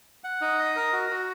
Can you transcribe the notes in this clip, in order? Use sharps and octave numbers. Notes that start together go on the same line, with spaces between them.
F#5
D#4
D#5
A#4
F#4
F#4